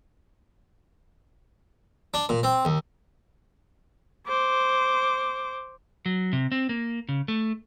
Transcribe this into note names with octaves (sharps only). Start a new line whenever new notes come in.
D4
A#2
C4
D#2
C5 D6
F#3
C3
C4
A#3
C#3
A3